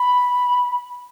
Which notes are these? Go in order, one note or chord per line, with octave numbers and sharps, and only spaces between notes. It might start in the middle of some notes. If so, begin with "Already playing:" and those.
Already playing: B5